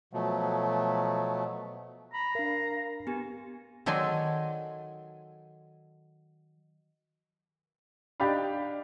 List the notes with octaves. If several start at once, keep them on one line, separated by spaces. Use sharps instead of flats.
B2 F3 F#3 A3
A#5 B5
D4 A#4 F5
B3 G4 G#5
D#3 F#3 A4 D5 G#5 C6
D4 D#4 G4 D5 F5 B5